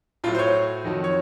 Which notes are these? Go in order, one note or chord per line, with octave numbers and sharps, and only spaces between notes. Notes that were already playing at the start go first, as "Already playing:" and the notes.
A2 F#3 F4
C5
C#5
F2 D#3 F#3
C#5